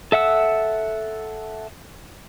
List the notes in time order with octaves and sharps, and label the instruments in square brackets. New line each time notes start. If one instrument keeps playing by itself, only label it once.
[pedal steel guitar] A4 E5 F#5 E6